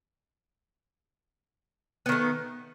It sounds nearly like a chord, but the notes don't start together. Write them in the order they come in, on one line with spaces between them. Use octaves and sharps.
B3 D#3 A3